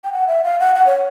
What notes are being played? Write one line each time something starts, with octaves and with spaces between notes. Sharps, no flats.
G5
F#5
E5
F5
F#5
F#5
C#5